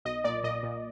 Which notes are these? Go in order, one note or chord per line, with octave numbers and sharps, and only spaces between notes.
B1 D#5
A#2 D5
A#2 D#5
A#2